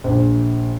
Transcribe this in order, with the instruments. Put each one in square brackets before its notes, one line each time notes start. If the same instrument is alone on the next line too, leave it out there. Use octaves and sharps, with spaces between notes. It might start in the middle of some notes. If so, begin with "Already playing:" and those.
[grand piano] A#1